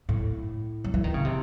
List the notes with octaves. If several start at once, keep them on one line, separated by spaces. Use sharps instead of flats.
A2
F#3
E3
D#3
C#3
C3